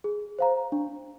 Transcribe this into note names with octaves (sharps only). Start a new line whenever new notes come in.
G#4
C5 F5 A#5
D4